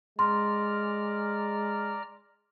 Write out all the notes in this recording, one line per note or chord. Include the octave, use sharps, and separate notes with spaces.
G#3 D5 A#5 C6 F6